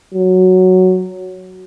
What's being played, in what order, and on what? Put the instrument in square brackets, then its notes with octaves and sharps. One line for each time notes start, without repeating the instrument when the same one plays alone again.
[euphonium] F#3